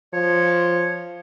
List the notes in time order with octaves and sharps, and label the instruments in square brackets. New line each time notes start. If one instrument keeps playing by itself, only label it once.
[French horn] F3 [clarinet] C#5